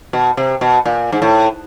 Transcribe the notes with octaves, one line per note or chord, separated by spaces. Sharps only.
B2
C3
B2
A#2
G#2
A2